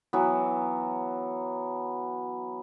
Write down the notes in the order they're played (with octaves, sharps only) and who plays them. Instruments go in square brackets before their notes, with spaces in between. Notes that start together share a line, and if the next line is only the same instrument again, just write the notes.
[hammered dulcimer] E3 F#3 B3